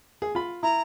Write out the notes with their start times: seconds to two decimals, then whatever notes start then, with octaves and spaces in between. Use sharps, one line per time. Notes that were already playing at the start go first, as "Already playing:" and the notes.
0.22 G#4
0.35 F4 B5
0.63 E4 A#5